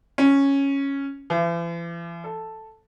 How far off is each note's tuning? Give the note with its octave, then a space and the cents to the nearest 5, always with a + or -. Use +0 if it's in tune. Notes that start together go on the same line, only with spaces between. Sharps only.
C#4 -5
E3 +45
A4 +0